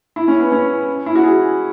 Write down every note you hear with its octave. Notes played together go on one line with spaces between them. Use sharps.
E4
C#4
B3
C#4
E4
F#4
G#4